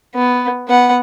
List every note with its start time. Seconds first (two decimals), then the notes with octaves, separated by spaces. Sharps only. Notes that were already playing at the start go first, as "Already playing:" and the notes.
0.15 B3
0.68 B3 F#5